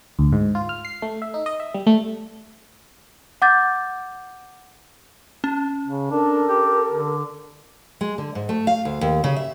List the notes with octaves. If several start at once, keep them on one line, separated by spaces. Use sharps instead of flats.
D2
G#2
F4
F6
C7
A3
E5
D#4
D#5
E5
G3
A3
F#5 D6 G6 A6
C#4
C#3
D4 A4 A#4
G4
D3
G#3
D3
G#2
A3
F5
D2
D#2
C#3
E5